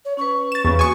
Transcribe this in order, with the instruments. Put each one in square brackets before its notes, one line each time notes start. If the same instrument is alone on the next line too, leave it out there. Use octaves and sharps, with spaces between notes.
[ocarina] C#5
[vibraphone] C#4 B4 [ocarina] C#6
[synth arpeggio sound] A6 E7
[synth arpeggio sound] E2 C#3 [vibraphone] B4
[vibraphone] A#3 F#4 [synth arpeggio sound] G#5 C#6 [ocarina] D#6